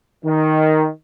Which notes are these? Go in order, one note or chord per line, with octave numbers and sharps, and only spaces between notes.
D#3